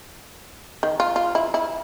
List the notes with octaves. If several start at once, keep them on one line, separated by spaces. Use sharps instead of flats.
D#3
F4
F4
E4
E4